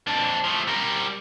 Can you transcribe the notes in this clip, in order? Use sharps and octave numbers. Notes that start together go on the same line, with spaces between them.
F2 D4
F3 A3
G3 A#4